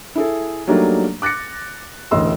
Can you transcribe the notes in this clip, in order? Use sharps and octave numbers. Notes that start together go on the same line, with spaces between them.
E4 G#4 A4
F#3 G3 A3 A#3 D4 D#4
D6 F#6 A6 A#6 C#7
E1 A1 D2 D#5 C6 E6